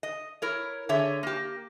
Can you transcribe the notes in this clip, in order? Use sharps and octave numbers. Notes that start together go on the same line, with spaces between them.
D#5
E4 A#4 C#5
D3 G#4 C#5 E5
A#3 G4